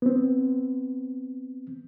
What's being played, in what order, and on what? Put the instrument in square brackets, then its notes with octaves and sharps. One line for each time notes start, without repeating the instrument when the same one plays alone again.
[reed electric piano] B3 C4